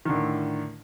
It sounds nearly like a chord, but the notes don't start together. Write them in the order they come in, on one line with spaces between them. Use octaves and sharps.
D#3 D3 A2